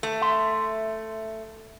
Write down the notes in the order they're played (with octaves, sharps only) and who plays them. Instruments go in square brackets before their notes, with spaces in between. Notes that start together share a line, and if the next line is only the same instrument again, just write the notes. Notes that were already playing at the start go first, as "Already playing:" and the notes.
[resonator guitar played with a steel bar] A3
[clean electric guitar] E5 C6